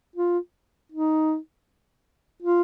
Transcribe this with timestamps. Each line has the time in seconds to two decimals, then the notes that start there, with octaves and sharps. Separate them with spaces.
0.16 F4
0.92 D#4
2.42 F4